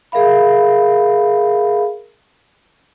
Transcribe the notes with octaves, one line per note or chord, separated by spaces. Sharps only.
G#4 A#4 E5 F5 B5